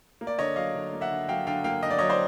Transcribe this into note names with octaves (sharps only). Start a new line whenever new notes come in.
A#3
D5
D3 C#5 D#5
F#3 D#5 F5
D3
A#3
E5 F#5
D3
F#3 F5 G5
D3 F5 G5
A#3 F5 G5
D3 D#5
D5
F#3 C#5 D#5
C5 D5